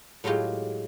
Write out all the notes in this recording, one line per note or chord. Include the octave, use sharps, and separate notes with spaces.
A2 F#3 G#3 F4 G4